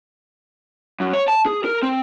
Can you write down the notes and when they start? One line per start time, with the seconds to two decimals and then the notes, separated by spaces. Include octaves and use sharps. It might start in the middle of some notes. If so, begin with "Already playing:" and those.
1.00 F#2
1.13 C#5
1.28 A5
1.46 G#4
1.65 A#4
1.83 C4